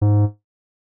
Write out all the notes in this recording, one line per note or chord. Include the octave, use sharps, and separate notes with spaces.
G#2